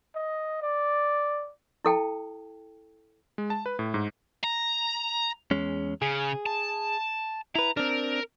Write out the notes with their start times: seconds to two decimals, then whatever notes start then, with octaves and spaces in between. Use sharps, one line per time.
0.15 D#5
0.62 D5
1.85 E4 A4 G5 A5
3.38 G#3
3.50 A5
3.66 B4
3.79 A2
3.94 G#2
4.44 A#5
5.51 E2 G#3 C#4
6.02 C#3 G#4
6.46 A5
7.56 E4 B4 A#5
7.77 C4 D4 A#4